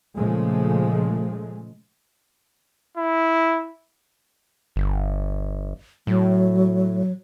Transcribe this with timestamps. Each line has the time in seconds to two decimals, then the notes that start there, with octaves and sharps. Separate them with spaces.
0.17 A#2 C#3 F3 G#3 A3
2.98 E4
4.76 G1
6.07 A2 F#3